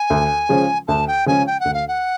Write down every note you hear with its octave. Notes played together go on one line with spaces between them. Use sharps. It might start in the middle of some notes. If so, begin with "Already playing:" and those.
Already playing: G#5
D2
C#3 F3 G#3 C#4
D2 A5
G5
C#3 F3 G#3 C#4 G#5
G5
F#5
D2
F5
F#5